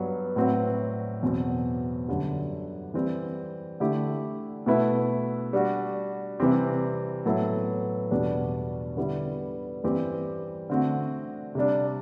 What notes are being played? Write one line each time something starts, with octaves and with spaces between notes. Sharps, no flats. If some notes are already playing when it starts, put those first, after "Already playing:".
Already playing: G2 F#3 B3
A2 F#3 C4 F#4 B4
E2 B2 F#3 C4
F#2 D3 G3
E3 G3 C4
D3 A3 E4 G4
B2 A3 E4 B4
G3 D4 F#4
C3 E3 G3 C4 G4
A2 F#3 B3 E4 A4
E2 B2 G3 D4
D3 G3 B3 E4
G2 E3 G3 C4 G4
D3 A3 C4 F#4
C3 G3 D4